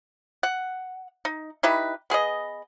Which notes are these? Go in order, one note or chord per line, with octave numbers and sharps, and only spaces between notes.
F#5
D#4
D#4 E4 G4 B4
B3 G#4 B4 D#5